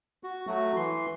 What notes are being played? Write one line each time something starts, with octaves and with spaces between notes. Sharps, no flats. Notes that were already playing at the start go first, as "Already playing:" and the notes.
F#4
F#3 A3 F#4
E3 C6